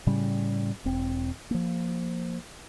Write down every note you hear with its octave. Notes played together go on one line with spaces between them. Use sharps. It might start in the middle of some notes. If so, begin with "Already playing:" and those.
A2 C#3 G3 C#4
E1 C4
F3 A#3